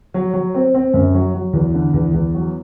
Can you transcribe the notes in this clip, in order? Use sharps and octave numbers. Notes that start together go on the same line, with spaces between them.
F#3
F#3
C4
C4
F#2
F#3
F#3
E2
D3
E2
E2
F#3